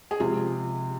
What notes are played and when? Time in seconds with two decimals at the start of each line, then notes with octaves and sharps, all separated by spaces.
0.11 G#4
0.20 C3 F3 G#3 F4